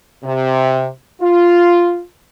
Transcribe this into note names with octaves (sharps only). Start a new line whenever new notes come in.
C3
F4